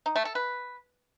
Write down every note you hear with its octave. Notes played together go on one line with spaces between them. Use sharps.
D#4
A3
A4
B4